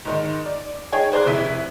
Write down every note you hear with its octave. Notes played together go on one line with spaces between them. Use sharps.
G#2 D#3 D#4
D5
D#4 G#4 C#5 G5 G#5
G#4 C5 D5 A#5 F#6
F1 E4 B6 D#7